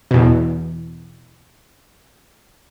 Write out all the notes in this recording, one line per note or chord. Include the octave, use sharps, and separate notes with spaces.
E2 B2